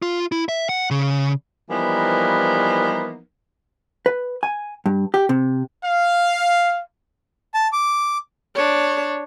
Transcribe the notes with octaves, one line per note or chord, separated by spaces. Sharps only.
F4
E4
E5
F#5
C#3
E3 F3 G3 A#3 B3 D#4
B4
G#5
G2
G4
C3
F5
A5
D6
D4 C#5